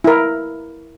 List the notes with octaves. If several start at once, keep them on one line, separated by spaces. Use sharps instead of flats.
E4 A#4